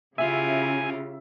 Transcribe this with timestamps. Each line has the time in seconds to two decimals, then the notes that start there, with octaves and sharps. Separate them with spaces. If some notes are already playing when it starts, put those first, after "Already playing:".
0.18 C#3 E4 F4 G4 E5 G#5